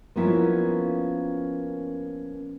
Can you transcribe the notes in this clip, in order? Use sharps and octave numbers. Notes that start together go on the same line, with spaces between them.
F3 A#3 B3 C#4 E4 F4